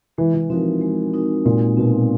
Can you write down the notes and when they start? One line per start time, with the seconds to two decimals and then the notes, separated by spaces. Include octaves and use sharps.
0.18 E3 G#3
0.34 E3
0.50 F3 C4 D#4 F#4 A#4
0.81 G#3
1.14 C4 D#4 F#4 A#4
1.45 A#2 G#3
1.77 B2 C4 D#4 F#4 A#4